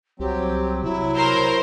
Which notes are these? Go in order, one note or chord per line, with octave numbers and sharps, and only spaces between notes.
C2 F#3 C4 G4
C3 F#3 E4
A#4 C5